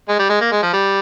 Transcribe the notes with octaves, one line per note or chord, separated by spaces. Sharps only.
G#3
G3
G#3
A#3
G#3
F3
G3